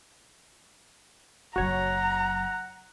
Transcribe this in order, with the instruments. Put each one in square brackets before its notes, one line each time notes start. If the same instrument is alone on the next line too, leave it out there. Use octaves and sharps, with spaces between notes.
[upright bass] F#1 F#3 [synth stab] F#4 C#5 [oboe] F#5 [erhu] A#5